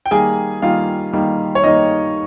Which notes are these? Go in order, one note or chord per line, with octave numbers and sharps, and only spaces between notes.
G5
D#3 G3 A#3 G#4 G#5
D#3 G3 A#3 F4 F5
D#3 G3 A#3
C#5
D#3 G3 A#3 D#4 D#5